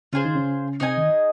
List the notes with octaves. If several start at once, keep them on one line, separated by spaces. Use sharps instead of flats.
C#3 C#4 F4 G#4 C5
D#3 D#4
C#3 C#4
C3 C4 D#4 G#4 D#5 G#5
D#3